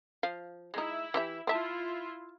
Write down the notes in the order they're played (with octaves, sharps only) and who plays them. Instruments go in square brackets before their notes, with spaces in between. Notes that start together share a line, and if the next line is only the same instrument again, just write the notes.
[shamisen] F3 F5
[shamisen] G#3 D#4 [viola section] E4
[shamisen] E3 G4 E5
[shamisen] C4 E5 A5 [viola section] E4 F4